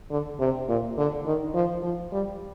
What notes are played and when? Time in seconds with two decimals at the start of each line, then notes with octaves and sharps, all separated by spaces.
0.11 D3
0.40 C3
0.69 A#2
0.98 D3
1.26 D#3
1.55 F3
1.83 F3
2.12 G3